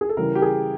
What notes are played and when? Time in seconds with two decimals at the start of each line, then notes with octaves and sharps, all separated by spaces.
0.01 G#4
0.09 A4
0.17 C#3 E3 G3 A#4
0.35 G4
0.42 G#4